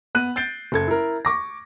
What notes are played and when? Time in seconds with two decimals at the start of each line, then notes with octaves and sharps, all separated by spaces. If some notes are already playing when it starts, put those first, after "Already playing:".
0.15 B3 F#6 D#7
0.36 G6 A6 C7 D7 G7
0.72 F#1 A4 G#6
0.88 E4 A#4
1.25 C#6 D6 A#6